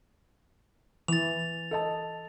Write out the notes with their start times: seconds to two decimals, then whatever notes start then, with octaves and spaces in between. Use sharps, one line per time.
1.08 E3 A6 F7
1.71 A4 D#5 A5